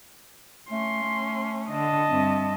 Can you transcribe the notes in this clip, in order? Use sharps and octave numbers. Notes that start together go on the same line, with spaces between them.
A3 C#4 C6
A3
D3 D#5 A5
G2 C4 E5